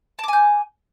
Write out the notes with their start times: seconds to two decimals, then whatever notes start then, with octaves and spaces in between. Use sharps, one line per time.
0.19 A5
0.23 D6
0.28 G#5
0.33 G6